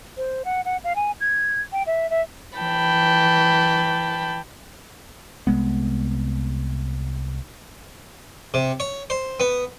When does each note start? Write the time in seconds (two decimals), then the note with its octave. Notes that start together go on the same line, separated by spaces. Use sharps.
0.17 C5
0.45 F#5
0.65 F#5
0.84 F5
0.96 G#5
1.20 G#6
1.72 G5
1.87 E5
2.10 E5
2.58 E3 G5 A5 B5
5.47 C2 G#3 B3
8.54 C3
8.80 C#5
9.10 C5
9.40 B3